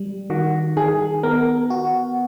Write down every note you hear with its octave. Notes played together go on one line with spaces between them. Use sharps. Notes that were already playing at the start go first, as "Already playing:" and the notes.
Already playing: G3
D#3 F#4
D#3 G#4
B3 A#4
F#4